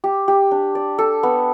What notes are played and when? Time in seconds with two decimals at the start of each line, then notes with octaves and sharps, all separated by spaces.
0.04 G4
0.28 G4
0.51 D4
0.75 D5
0.99 A4
1.23 B3